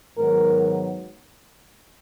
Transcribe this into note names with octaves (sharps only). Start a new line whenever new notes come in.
G#2 D#3 F#3 B3 A#4